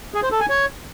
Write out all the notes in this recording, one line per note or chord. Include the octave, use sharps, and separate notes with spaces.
G#4
C5
A4
G#5
C#5